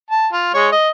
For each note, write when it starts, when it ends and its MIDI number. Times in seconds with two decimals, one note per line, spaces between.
0.11 0.28 81
0.33 0.50 65
0.54 0.69 56
0.54 0.69 73
0.72 0.90 75